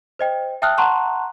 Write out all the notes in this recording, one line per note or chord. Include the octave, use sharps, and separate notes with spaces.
C5 D#5 G5
E5 G5 A5 D#6 F6 F#6
F#5 A5 A#5 C6 C#6 F#6